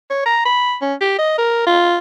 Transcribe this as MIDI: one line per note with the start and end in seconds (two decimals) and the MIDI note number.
0.10 0.25 73
0.26 0.44 82
0.45 0.76 83
0.81 0.94 61
1.01 1.16 67
1.19 1.38 75
1.38 1.65 70
1.67 1.98 65